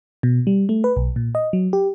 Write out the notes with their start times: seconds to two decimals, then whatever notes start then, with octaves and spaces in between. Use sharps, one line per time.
0.23 B2
0.47 G3
0.69 A3
0.84 B4
0.97 B1
1.16 A#2
1.35 D#5
1.53 F#3
1.73 G4